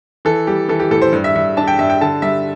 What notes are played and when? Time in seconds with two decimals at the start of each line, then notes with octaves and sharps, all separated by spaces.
0.25 E3 A4
0.47 G3 G4
0.69 E3 A4
0.80 G4
0.91 A2 A4
1.02 C5
1.13 G2
1.24 E5
1.35 G2 E5
1.57 D4 A5
1.68 G5
1.79 G2 E5
1.90 G5
2.01 D3 A5
2.22 G3 E5